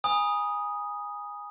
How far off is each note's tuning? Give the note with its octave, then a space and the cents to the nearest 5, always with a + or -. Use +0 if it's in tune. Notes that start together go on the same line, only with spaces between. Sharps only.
G#5 -15 B5 -40 D#6 +0